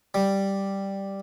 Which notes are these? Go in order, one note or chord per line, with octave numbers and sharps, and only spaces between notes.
G3